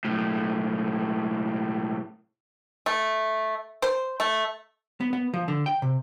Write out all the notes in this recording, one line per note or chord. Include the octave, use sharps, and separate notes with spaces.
B1 A2
A3
C5
A3
B3
B3
F3
D3
G5
C3